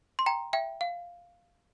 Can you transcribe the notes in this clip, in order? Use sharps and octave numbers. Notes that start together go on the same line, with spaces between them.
C6
G5 A#5
E5 G5
F5